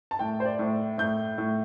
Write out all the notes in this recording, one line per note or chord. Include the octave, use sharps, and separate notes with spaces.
A5
A2 G5
C5
D5
A2
A2 G6
A2